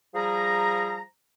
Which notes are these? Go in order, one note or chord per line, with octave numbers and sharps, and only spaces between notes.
F3 G3 G#4 A#5